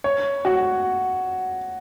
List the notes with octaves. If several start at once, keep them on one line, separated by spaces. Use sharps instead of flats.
C#5
F#4